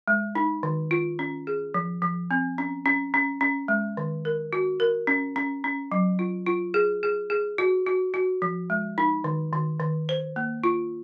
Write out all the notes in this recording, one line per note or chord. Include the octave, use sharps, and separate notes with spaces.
G#3
D#4
D#3
F4
C#4
G#4
F3
F3
C4
C#4
C#4
C#4
C#4
G#3
D#3
A#4
F#4
A#4
C#4
C#4
C#4
F#3
F4
F4
G#4
G#4
G#4
F#4
F#4
F#4
F3
G#3
D#4
D#3
D#3
D#3
C5
A#3
F4